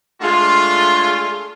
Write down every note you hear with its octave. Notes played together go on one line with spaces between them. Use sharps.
G#3 A3 D4 F4